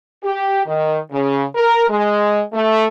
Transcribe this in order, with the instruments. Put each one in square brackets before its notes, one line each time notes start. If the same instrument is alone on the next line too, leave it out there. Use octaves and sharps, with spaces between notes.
[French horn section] G4
D#3
C#3
A#4
G#3
A3